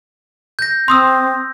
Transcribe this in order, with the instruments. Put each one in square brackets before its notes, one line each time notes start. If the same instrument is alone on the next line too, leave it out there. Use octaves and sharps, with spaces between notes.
[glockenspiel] G6 A#6
[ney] C4 [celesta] C6 D#6 E6